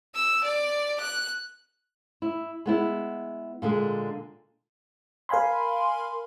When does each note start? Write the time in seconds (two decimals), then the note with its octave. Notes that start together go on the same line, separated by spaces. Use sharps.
0.14 E6
0.44 D5
1.00 F#6
2.22 E4
2.66 G#3 B3 E4
3.62 A#2 D3 G#3
5.29 A#4 F5 G#5 B5 C6